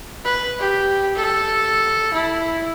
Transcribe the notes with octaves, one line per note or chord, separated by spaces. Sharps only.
B4
G4
A4
E4